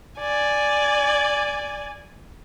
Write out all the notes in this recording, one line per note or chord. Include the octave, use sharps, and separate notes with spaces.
D5 G#5